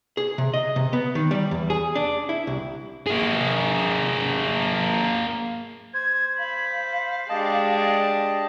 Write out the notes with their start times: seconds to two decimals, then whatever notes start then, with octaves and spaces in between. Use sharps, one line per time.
0.17 G#4
0.38 C3
0.54 D#5
0.76 C3
0.93 B3
1.15 D#3
1.31 G3
1.51 E2
1.70 G#4
1.95 D4
2.29 E4
2.47 C2
3.07 A#3 G#4
5.94 C5 G#6
6.39 F5 B5
7.29 G#3 D4 G4 D#5 A5